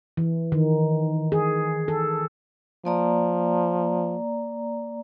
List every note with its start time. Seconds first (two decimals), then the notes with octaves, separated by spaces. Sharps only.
0.17 E3
0.52 D#3
1.32 G#4
1.88 A4
2.85 F3 A#3 D5 A#5